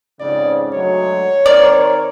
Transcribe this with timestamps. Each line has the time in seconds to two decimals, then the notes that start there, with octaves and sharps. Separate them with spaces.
0.20 F2 G#2 C#3 D5
0.74 D2 F#3 G#3 C#5
1.46 D#3 C4 A#4 D5